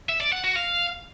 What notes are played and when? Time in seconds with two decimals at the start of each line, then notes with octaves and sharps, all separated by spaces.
0.09 E5
0.21 D5
0.32 F#5
0.44 F#4
0.56 F5